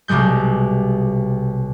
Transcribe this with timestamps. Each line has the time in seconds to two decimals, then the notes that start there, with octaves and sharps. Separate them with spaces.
0.08 B1 C3 G3 G#3 G6